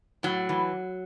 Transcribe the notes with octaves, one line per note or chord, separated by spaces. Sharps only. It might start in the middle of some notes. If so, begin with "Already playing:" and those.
A2 F#3
E3